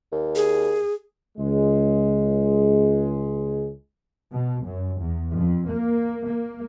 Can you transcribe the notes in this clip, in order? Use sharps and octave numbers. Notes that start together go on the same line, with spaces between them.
D#2
G#4
C#2 G#3
B2
F#2
E2
F2
A#3
A#3